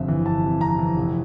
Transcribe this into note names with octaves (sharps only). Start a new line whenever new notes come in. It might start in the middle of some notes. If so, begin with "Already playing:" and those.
Already playing: G1 F2 C3 E5
E3
G1 A5
C3
F2 A#5
E3
F1